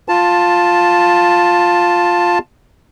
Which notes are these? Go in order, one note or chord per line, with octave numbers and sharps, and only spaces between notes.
F4 A5